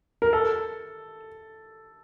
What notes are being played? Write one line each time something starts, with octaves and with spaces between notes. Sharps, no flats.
A#4
A4